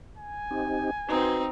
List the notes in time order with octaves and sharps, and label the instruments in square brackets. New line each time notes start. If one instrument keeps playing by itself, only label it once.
[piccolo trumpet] G#5
[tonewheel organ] C4 D#4 G4
[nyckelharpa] C4 D#4 [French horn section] F#4 B4 [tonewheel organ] C6 G6 G#6